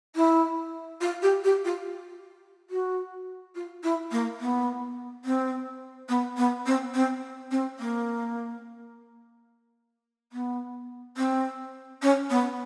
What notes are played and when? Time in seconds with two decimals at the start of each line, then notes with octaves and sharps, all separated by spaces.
0.16 E4
1.01 F4
1.22 G4
1.44 G4
1.65 F4
2.70 F#4
3.55 F4
3.83 E4
4.11 A#3
4.40 B3
5.25 C4
6.09 B3
6.37 B3
6.66 C4
6.94 C4
7.51 C4
7.79 A#3
10.32 B3
11.17 C4
12.02 C#4
12.30 B3